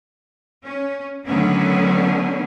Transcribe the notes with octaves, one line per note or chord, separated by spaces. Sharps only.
C#4
D3 D#3 F#3 A3 B3 C#4